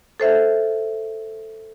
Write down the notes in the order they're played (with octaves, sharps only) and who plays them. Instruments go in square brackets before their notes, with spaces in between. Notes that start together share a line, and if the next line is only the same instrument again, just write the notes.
[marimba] A4 C5 E5